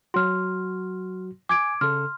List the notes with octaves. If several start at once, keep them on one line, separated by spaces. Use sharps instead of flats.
F#3 F#4 C6 F6
G#5 D6 G#6 D7
C#3 A4 C6 F6